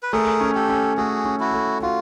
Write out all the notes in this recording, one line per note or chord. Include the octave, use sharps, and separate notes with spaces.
B4
A3 G#4 A#4
C#4
G4 A4
C#4
A3 F#4 G#4
C#4
E4 F#4
A3
F4 F#4